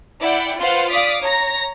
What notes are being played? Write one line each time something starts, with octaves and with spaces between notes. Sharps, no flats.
E4 D5 F#5 G5
F4 B4 C5 F5 F#5 C6
D5 F5 D6 D#6 B6
C#5 A#5 A#6